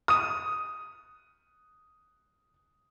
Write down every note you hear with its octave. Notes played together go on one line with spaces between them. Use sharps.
D#6 D#7